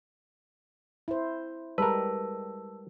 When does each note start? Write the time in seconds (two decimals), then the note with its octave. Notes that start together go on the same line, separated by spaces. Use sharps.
1.08 E4 C5
1.78 G3 G#3 G4 A#4 B4 A5 E6